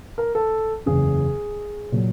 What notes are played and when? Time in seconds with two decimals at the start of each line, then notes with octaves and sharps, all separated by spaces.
0.18 A#4
0.35 A4
0.86 F#1 E2 C#3 G#4
1.92 A#2 F#3